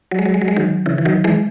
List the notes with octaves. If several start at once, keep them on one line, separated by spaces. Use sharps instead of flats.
F#3
G#3
F#3
G#3
F#3
G#3
D#3 F#3
C#3 E3
E3
D#3 F#3
E3 G#3